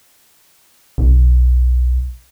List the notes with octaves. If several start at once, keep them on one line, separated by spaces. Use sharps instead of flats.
B1